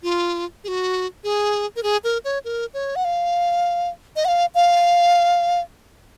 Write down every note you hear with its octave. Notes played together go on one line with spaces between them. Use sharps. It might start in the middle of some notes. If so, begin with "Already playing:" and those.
F4
G#4
F#4
G#4
A#4
G#4
A#4
C#5
A#4
C#5
F#5
F5
D#5
F#5
F5
F5